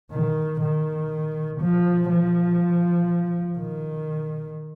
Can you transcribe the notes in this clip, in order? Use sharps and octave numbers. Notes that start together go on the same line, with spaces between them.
D#3
D#3
F3
F3
D#3